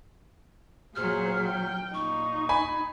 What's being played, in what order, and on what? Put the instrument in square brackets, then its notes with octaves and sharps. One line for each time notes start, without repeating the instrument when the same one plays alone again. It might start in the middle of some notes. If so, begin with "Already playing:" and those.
[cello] A#2 F#3 [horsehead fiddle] G#4 C5 [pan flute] F6
[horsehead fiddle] G5
[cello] A#2 [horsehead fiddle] D#4 [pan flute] C#6
[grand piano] G#5 B5